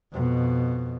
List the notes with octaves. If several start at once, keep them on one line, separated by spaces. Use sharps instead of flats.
F2 B2